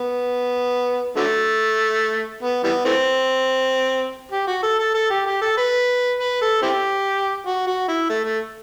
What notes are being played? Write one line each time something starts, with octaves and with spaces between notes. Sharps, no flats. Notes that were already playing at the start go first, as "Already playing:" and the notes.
Already playing: B3
D3 F#3 A3
B3
E3 G3 B3
E3 A3 C4
G4
F#4
A4
A4
A4
G4
G4
A4
B4
B4
A4
C4 E4 G4
F#4
F#4
E4
A3
A3